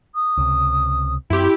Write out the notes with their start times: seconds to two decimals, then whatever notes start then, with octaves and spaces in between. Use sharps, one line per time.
0.14 D#6
0.37 C#2 C3
1.30 F#2 F#3 C4 E4 G4 C6